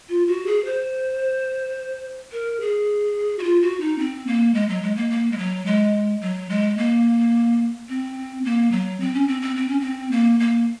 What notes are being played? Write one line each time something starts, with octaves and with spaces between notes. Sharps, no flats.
F4
F#4
G#4
C5
A#4
G#4
F#4
F4
F#4
D#4
C4
A#3
G#3
F#3
G#3
A#3
A#3
G#3
F#3
G#3
F#3
G#3
A#3
C4
A#3
F#3
C4
C#4
C4
C4
C4
C#4
C4
A#3
A#3